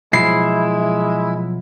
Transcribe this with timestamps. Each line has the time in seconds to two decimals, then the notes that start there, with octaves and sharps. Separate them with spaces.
0.13 B2 F3 F#3 G#3 E4 C7